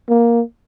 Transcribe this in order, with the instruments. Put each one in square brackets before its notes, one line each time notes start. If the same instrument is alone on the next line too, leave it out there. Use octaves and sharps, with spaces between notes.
[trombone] A#3